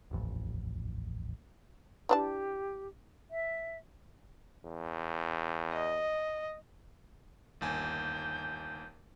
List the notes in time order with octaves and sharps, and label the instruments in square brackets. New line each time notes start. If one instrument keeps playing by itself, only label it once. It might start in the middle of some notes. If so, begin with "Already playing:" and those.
[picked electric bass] D#1 A1 F2
[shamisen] E3 D4 A5 [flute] G4
[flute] E5
[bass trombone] E2
[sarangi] D#5
[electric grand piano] G1 D#2 G#5 [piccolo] G6